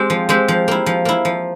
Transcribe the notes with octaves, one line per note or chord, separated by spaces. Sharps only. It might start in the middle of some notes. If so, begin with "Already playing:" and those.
Already playing: G#3 C4 G4
F3
G#3 C4 G4
F3
A#3 E4
F3
A#3 E4
F3